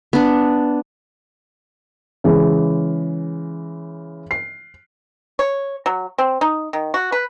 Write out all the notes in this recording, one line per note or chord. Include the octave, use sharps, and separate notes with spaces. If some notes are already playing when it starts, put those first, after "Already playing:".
B3 D4
C#3 E3 G#3
C7
C#5
F#3
C4
D#4
D#3
F#4
B4